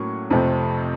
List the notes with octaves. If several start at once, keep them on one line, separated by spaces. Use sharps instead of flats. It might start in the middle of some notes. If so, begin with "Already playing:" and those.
Already playing: A2 F#3 A#3 C#4 C#6
F2 C3 F3 A3 C4